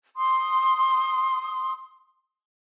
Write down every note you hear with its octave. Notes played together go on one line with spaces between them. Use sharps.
C6 D#6